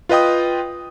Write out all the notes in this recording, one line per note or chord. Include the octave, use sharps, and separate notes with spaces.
F4 B4 D#5 G5 D#6